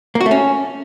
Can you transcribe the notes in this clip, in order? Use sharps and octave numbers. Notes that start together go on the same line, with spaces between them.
A#3
F#4
A3
C#4